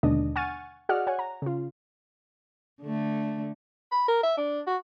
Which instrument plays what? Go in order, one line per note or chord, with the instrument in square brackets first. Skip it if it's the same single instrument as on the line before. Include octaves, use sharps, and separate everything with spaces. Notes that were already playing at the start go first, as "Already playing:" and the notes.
[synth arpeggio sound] D#2 B2 D3 G#3 D4 D#5
F#5 G#5 C#6 F6 A6 D#7
F#4 G#4 D5 D#5 F#5 F6
C#5 F#5 G#5
A#5
C#3 F4
[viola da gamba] D3 A3
[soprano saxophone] B5
A#4
E5
D4
F#4